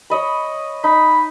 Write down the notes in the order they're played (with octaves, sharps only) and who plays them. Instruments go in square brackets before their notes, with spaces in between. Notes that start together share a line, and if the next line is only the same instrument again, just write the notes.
[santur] C#5 D#5 B5
[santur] D#4 [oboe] B5